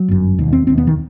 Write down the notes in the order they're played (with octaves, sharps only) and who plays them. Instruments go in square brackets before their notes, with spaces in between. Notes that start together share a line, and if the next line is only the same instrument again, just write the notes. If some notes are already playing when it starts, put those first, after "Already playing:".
Already playing: [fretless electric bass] F#3
G1 F#2
E1 D#2
C4
E1 D#2 C4
B3
D#3